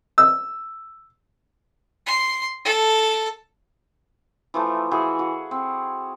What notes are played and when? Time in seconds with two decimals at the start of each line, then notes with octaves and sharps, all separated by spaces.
0.18 E6
2.06 C6
2.65 A4
4.54 E3 F3 A3
4.91 E3 F#4 G#4
5.19 F#4
5.51 C4